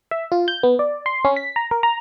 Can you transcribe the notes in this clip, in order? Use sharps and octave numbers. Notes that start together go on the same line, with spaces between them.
E5
F4
G6
B3
D5
C6
C#4
B6
A#5
A#4
A#5